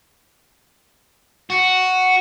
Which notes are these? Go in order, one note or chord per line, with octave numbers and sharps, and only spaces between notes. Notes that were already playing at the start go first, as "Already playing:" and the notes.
F#4